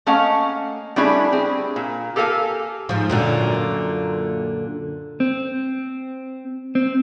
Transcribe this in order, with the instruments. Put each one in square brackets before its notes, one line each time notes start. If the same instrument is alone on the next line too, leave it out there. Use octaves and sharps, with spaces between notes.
[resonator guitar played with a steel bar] A3 A#3 C#4 D#5 F5 F#5
G3 A3 C#4 D4 E4 G#4
C4 G#4
A#2
G4 A4 A#4 F5 G#5
[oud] G#2 F3
F#2 A#2 D3
[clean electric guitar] C4
C4